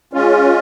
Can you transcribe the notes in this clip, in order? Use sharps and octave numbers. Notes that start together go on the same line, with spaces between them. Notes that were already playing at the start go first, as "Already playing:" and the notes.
G#3 C#4 F4